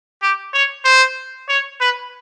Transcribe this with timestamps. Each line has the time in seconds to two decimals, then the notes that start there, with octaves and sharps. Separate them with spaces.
0.22 G4
0.53 C#5
0.84 C5
1.49 C#5
1.80 B4